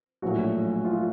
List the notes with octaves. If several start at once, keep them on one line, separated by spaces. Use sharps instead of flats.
A#1 A2 F#3 F#4
F4